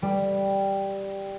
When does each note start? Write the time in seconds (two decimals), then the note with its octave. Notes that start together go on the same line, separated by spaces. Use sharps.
0.02 G3